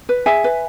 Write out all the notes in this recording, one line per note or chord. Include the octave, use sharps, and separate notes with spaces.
B4
G#4 E5 G#5
B4